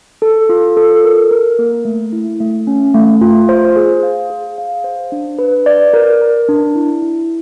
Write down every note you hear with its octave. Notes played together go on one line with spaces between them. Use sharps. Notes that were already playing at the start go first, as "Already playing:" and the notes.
A4
F4
A4
A#4
A#4
A#3
A3
E4
A3
C#4
A3
F4
C5
G#4
F5
G#4
F5
C5
D4
B4
D5
A#4
A#4
D4
E4
E4